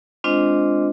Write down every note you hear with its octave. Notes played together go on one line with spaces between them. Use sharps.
G#3 C4 D4 F4 C5 D#5